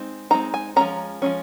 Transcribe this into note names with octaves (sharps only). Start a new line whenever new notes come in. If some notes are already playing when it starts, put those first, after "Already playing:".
Already playing: G#3 C4 D#4
G#3 C4 D#4 A#5
G#5
F3 G#3 C#4 A#5
F3 G#3 C#4